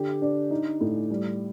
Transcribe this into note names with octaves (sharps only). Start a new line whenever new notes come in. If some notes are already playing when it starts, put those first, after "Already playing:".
Already playing: D3 G4
D4
D#4
A2
G3